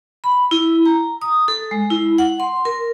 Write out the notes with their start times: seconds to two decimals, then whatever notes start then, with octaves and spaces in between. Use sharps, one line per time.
0.24 B5
0.51 E4
0.86 A#5
1.22 D#6
1.48 A4
1.71 G#3
1.91 E4
2.18 F#5
2.40 C6
2.65 A#4